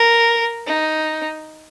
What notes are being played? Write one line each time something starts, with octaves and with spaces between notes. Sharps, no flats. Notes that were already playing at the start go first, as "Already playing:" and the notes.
Already playing: A#4
D#4